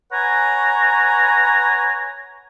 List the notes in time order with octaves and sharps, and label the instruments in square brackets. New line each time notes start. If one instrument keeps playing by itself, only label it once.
[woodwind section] B4 C#5 F#5 G#5 A#5